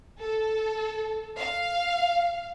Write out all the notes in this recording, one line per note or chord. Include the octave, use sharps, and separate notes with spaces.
A4
F5